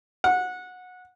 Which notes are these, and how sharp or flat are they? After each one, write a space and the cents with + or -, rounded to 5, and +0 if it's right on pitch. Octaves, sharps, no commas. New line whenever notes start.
F#5 -20